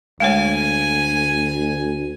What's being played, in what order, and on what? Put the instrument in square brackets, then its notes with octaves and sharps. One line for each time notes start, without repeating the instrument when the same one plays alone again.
[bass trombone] D2 [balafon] G#3 A3 C#5 [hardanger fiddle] G#5